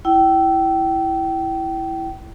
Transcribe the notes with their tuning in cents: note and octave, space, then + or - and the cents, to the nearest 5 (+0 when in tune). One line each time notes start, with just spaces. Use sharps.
E4 +5 G5 -25